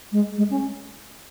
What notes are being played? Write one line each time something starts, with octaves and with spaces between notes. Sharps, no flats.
G#3
G#3
C#4